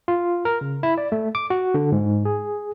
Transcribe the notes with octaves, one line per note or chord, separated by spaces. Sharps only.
F4
A#4
C#3
E4
D5
A3
D6
F#4
D3
G#2
G#4